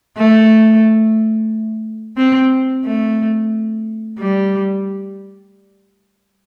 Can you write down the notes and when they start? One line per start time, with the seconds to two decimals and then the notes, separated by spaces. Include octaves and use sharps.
0.17 A3
2.17 C4
2.85 A3
4.19 G3